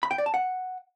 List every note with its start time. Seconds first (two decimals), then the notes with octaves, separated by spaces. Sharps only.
0.03 B5
0.11 G5
0.18 D5
0.26 A5
0.34 F#5